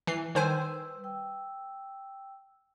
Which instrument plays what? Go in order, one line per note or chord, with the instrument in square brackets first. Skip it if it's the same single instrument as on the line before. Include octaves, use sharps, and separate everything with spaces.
[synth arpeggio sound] E3 C7
[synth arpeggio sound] D#3 C5 G#5 [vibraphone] G3 B4 E6
[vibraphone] G5 E6